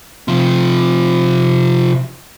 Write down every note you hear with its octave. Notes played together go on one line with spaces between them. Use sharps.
C3 F3